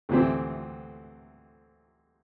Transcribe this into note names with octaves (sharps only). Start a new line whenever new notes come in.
D2 C3 E3 A3 C4